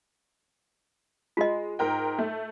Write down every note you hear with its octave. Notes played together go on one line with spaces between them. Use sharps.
G#3 F4 D#5
G#2 A#4 G5
A3